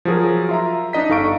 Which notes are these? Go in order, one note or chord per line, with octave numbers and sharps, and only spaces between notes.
F3 F#3 G#4 A#4
F4 E5 A#5
D4 D#4 D#5 B6
G1 D#4 A4 F5 C#6 D7